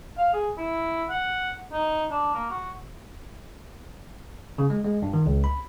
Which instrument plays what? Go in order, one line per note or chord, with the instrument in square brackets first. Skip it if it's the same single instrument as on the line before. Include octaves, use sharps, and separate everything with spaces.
[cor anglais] F5
G#4
E4
F#5
D#4
D4
A#3
F#4
[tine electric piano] C#3
G#3
G#3
G2
D#3
C#2
B5